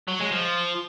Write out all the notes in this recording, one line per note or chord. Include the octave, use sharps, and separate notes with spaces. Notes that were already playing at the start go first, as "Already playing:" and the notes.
F#3
G#3
F3